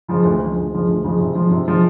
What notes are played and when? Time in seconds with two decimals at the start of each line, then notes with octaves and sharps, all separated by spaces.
0.09 C#3 F3 G#3
0.24 D2
0.41 C#3 F3 G#3
0.56 D2
0.73 C#3 F3 G#3
0.87 D2
1.04 C#3 F3 G#3
1.20 C3
1.35 F3 G#3
1.51 C3
1.67 F3 G#3